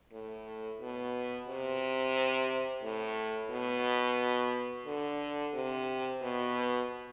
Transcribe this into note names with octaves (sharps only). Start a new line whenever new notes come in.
A2
B2
C3
A2
B2
D3
C3
B2